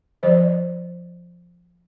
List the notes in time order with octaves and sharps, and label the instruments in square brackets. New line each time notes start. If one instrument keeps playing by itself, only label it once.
[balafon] F3 C5 D5 D#5